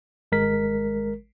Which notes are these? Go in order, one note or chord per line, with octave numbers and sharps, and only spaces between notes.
G#1 G#3 A#4 B6